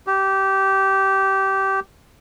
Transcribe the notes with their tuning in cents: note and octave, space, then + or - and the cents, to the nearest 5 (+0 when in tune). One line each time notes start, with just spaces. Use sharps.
G4 -20